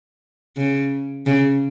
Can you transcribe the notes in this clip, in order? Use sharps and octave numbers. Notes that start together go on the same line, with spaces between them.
C#3
C#3